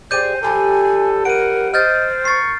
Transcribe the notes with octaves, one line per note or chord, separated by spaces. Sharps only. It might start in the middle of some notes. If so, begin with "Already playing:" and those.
G4 G#4 C5 D5 G6 D#7
F3 G3 G4 A4 G#5
A#4 F#5 D7 D#7
C5 D#5 F6 G6 A6
A#4 C#6 A6 C7